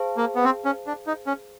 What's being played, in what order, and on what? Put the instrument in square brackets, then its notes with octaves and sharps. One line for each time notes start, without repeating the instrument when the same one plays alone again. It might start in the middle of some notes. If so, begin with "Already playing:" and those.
Already playing: [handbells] G#4 C5 F5 A5
[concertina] A#3
B3
C4
C#4
D4
D#4
C#4